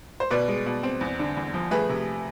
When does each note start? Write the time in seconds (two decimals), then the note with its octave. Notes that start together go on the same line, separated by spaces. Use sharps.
0.20 C5
0.31 B2 B4 D5
0.48 G#3
0.66 B2
0.83 C4
1.01 E2
1.19 D3
1.37 E2
1.54 F3
1.71 A3 G#4 B4
1.89 C3